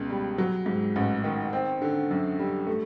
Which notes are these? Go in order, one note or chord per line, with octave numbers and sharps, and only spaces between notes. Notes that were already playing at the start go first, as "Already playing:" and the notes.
Already playing: C#2 B2
G3
F#3
G#2
A1
D#3
C4
D3
F#2
G3
A3